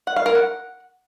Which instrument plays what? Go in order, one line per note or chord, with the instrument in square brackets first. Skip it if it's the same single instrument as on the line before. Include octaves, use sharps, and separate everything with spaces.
[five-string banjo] F#5
F5
A#4
F#5